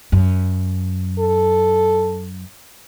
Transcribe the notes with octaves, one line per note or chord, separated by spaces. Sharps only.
F#2
A4